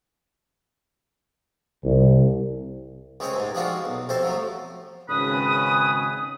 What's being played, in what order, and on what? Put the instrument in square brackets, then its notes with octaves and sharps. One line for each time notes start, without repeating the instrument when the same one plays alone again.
[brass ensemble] C2
[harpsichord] C#2 G#3 C4 C#5 G5 G#5
G#2 C3
F3 G#3 C4 D4 F4 F#4
B1
F2 C3 A4 C5 A5
F3 F#3 A3
[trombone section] G#1 C#3 [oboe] B4 [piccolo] D#6